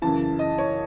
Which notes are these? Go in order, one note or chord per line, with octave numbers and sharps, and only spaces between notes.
F#2 C#3 E3 A5
D#5
C#5